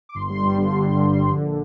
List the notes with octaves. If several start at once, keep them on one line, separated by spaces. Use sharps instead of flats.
D6
G1 C6
G3
G2
D3
G1
G3
G2
D3
A#1